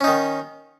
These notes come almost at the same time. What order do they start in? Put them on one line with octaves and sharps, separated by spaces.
C#4 D#4 D#3